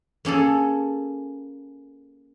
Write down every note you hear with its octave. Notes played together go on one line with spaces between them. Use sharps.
A#3 C#4 G#4 A4